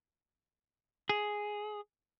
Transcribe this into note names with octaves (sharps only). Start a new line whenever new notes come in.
G#4